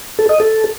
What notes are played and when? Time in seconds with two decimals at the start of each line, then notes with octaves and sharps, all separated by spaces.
0.19 A4
0.29 D#5
0.40 A4